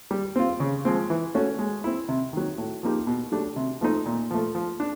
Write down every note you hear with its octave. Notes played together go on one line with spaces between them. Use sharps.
G3
C4 F4
C#3
F3 G#3 C4
E3
A3 C#4 F#4
G#3
C4 E4
C3
D#3 F#3
A2
F3 A#3 D#4 G4
B2
F#3 A3 D4 G4
C3
F3 A3 C4 D#4
A#2
F3 A3
F3
D4